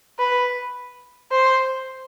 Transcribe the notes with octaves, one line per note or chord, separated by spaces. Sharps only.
B4
C5